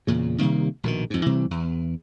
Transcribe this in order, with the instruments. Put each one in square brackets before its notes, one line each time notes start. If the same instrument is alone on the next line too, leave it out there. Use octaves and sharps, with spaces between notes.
[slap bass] E2 A#2 C#3
C3 D#3 G3 A#3
A#1 B2 D3 D#3
F2 G#2
C3 E3 G3 C4
E2